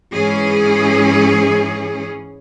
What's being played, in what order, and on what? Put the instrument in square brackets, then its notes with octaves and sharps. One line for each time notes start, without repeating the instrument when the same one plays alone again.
[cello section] G#2 E3 C#4 G#4